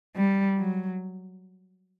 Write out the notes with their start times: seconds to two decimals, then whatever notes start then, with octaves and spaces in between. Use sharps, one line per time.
0.16 G3
0.58 F#3